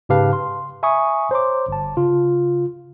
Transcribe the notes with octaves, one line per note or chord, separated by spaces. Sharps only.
G#2 C#3 G4 B4 F5 A5
C6
E5 G#5 B5 C#6 D#6
C5 C#5 A#5 C6 D6
G1 A5
C#3 F4